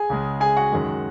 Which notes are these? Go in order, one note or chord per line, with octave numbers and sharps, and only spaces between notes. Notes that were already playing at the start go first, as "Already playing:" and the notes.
Already playing: G#4 G#5
C#2 C#3 G#3
G#4 G#5
F#4 F#5
F#2 D#3 G#3